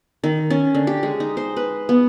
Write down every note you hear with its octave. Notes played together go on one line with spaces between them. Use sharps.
D#3
C#4
D3
G4
G#3
D#4
C5
B4
B3